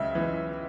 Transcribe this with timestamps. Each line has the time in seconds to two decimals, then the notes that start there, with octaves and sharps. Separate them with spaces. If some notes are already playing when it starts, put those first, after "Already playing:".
Already playing: C#2 C#3 G#3 E5
0.15 E3